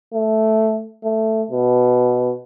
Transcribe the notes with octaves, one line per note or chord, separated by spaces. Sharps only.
A3
A3
B2